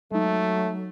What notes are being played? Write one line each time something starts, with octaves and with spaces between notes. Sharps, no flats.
F#3 G#3 A3 D#4